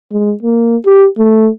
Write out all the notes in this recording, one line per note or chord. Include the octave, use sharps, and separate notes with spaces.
G#3
A#3
G4
A3